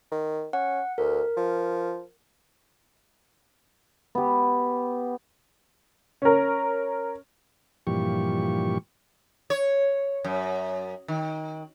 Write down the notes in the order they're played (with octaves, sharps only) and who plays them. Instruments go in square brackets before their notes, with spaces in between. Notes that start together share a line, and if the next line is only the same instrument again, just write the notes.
[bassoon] D#3
[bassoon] C#4 [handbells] F#5
[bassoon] D2 [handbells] A#4
[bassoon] F3
[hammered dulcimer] B3 G4
[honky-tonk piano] C#4 A#4
[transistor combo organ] G2 A#2 E3 F3 G4 C#6
[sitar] C#5
F#2
D#3